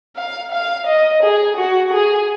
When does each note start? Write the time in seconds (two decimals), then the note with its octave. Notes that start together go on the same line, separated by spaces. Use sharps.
0.16 F5
0.52 F5
0.87 D#5
1.23 G#4
1.57 F#4
1.93 G#4